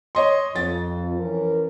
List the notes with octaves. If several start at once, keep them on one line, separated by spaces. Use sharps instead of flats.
C#5 D#5 C6
F2 A6
E3 C#4 A#4